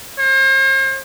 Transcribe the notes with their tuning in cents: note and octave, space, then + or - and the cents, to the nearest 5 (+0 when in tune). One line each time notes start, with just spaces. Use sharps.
C5 +40